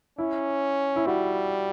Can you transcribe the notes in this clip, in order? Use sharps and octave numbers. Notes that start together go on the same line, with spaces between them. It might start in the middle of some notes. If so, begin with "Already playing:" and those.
C#4 E4
E4
G3 F#4